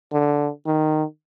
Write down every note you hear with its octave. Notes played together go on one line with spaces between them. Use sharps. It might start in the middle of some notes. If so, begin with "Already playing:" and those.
D3
D#3